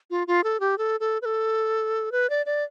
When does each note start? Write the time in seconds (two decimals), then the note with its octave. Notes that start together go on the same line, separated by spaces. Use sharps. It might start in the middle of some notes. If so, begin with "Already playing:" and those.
0.11 F4
0.27 F4
0.44 A4
0.60 G4
0.78 A4
1.00 A4
1.22 B4
1.25 A4
2.12 B4
2.30 D5
2.46 D5